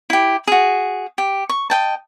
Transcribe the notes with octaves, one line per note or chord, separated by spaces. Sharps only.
E4 G4
F#4 G#4
G4
C#6
D#5 G5 A5